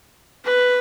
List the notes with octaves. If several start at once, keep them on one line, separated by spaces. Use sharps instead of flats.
B4